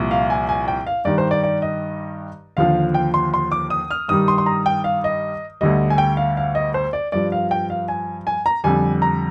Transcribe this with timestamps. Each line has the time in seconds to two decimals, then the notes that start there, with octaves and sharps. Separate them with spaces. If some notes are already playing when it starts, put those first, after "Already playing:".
Already playing: C2 A#2 F3
0.11 F5
0.30 G#5
0.49 G#5
0.68 G5
0.87 F5
1.05 G2 D#3 G3 D5
1.18 C5
1.31 D5
1.43 D5
1.62 D#5
2.57 D#2 D3 F3 F5
2.94 G5
3.14 C6
3.34 C6
3.52 D6
3.70 D#6
3.91 F6
4.08 G2 D#3 G3 D#6
4.28 C6
4.38 C6
4.46 A#5
4.66 G5
4.84 F5
5.04 D#5
5.61 D2 D3 G3 D#5
5.90 G#5
5.98 G5
6.17 F5
6.37 F5
6.55 D#5
6.74 C5
6.93 D5
7.12 G2 F3 D5
7.32 F5
7.51 G5
7.70 F5
7.88 G#5
8.27 G#5
8.46 A#5
8.64 F2 D3 G3 G#5
9.02 A#5